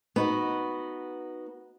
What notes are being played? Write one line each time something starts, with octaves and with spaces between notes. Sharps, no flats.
B3 D#4 F#4